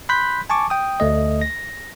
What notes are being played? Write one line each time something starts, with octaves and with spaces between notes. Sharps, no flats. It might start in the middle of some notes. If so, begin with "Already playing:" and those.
B5 C6 F#6 G6 B6
G#5 A5 C#6 D6
G5 D#6
D2 A3 D#5
A#6